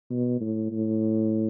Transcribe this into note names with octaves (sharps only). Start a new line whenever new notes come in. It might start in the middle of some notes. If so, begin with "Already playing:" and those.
B2
A2
A2